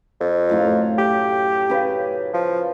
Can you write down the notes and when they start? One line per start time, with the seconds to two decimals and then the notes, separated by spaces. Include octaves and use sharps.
0.20 F2
0.49 F#2 A2 F5
0.98 G4
1.70 C#3 B4
2.34 F3